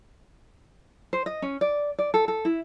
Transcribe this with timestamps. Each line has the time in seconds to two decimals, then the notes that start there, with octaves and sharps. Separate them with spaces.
1.13 C5
1.26 D#5
1.42 C#4
1.61 D5
1.99 D5
2.14 A4
2.28 A4
2.45 E4